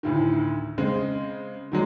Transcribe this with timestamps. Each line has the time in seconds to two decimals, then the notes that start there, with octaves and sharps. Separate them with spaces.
0.03 D2 A2 D#3
0.78 C#3 G#3 C4
1.72 D#3 F#3 G#3 D4